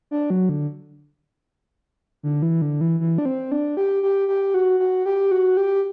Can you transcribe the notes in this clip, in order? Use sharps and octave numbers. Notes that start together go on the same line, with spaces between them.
D4
F#3
D3
D3
E3
D3
E3
E3
D4
C4
D4
G4
G4
G4
F#4
F#4
G4
F#4
G4